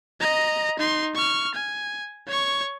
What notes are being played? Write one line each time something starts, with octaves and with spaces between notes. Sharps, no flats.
D#5 A#5
D#4 C6
C#6 F6
G#5
C#5 C#6